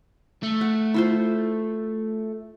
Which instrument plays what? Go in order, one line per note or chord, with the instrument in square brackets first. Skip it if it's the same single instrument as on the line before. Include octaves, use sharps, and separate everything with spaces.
[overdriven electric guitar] A3
[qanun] F#5
E4 F4 C5